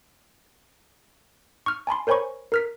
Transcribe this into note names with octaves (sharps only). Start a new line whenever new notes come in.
C#6 F6
G#5 A5 B5 C6
A#4 C5 C#5 G#5 B5 C#6
A#4 F6 B6